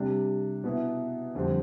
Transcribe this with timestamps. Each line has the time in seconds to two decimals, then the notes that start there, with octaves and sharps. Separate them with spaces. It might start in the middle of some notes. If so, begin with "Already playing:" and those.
Already playing: C3 G3 D4
0.64 B2 B3 E4
1.35 F2 D3 G3 C4